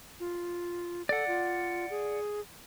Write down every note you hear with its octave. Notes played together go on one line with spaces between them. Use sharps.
F4
A4 D5 F#5
F4
G#4